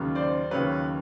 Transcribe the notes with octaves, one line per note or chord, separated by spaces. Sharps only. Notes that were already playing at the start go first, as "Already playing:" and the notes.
Already playing: D#2 C#3 F#3
C5 D5
D#2 C#3 F#3 B4 C#5